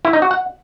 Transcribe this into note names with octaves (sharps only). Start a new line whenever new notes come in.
E4
D#4
F#4
F#5